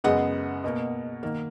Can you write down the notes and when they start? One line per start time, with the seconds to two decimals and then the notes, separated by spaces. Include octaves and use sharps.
0.04 F#2 C#3 G#3 B3 D#5 F#5
0.64 B2 A#3
1.23 D#3 A#3